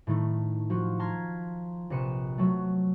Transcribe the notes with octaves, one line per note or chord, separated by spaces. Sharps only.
A2 D#3 A3
F3 F4 F#4
A5 A#5 C6 F6 G#6 B6
A#1 C3 B4 C#7 D#7 E7
F#3 A3